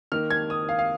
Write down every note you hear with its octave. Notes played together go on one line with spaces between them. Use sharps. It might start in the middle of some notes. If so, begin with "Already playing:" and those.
D#3 A#3 F6
G#6
D#6
F5
F5